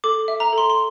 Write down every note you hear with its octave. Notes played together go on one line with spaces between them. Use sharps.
A4 D6
E5
A#5
A4
C6
C6